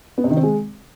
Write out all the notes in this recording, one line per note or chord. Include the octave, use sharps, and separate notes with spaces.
B3
C3
D#3
C4
G#3